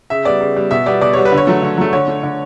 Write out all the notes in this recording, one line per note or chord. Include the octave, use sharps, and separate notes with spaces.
C#3 E5
G3 B3 D5
C#3
G3 B3
B2 E5
G3 B3 D5
B2 D5
G3 B3 C#5
B4
D3
C#5
F#3 A3
D3
F#3 A3
D3 C#5
A3
D3